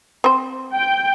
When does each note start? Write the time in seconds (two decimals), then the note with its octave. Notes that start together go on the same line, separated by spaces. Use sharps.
0.24 C4 C5
0.75 G5